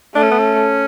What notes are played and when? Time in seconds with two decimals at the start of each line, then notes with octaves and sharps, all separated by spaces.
0.15 A3 D4
0.23 C#4
0.31 B3
0.39 C#4